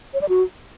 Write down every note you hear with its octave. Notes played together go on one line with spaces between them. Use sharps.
C#5
D5
F#4